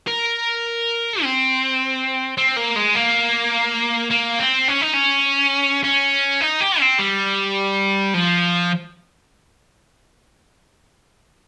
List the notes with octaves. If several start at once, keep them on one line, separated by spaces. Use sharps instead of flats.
A#4
C4
C4
A#3
G#3
A#3
A#3
C4
C#4
D#4
C#4
C#4
D#4
G4
C4
G3
F3